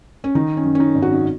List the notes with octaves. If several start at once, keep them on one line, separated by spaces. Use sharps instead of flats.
C#4
D#3 D#4
C#4
F#2
C#4
D#4
G#1
F#4
D#4